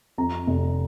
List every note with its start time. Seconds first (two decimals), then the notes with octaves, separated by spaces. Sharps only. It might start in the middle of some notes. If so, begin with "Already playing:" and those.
0.18 F2 A#5
0.47 F1